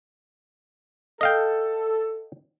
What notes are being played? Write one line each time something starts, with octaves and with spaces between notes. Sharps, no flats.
A4 D#5 F5 G5